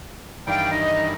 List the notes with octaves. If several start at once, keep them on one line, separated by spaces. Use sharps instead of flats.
G2 D#3 E3 D5 F5 G5
D#4 D#5